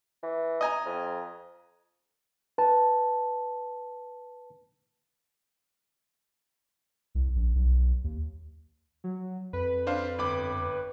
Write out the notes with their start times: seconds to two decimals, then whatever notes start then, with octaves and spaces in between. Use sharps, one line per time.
0.23 E3
0.61 D#5 G#5 A#5
0.85 F2
2.58 B4 A5
7.15 C2
7.35 A#1
7.55 B1
8.04 D#2
9.04 F#3
9.53 F2 B4
9.87 D4 C5 F5
10.18 G1 B5 D6